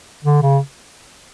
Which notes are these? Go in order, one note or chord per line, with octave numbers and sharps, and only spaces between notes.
D3
C#3